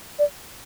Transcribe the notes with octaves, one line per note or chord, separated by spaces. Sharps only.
D5